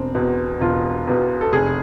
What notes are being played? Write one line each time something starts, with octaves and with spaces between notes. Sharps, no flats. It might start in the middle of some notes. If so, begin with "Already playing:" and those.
Already playing: E1 C4
E2 B2
E1 F4
E2 B2
A4
F1 G#4